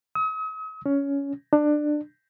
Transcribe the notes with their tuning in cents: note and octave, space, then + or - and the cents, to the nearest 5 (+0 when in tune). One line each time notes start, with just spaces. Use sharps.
D#6 +45
C#4 +15
D4 +20